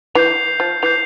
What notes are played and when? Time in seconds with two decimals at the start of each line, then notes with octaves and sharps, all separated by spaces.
0.15 E3 G6 C7 F7
0.60 F3
0.82 E3 G6 C7 F7